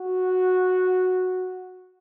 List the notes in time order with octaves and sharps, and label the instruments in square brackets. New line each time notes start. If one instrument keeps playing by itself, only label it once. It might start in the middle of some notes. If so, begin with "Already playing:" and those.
Already playing: [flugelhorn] F#4